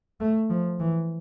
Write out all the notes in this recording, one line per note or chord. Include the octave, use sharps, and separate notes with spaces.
A3
F3
E3